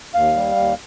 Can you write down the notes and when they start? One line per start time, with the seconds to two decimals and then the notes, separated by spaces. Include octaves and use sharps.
0.14 D#2 F5
0.36 G3
0.56 D#2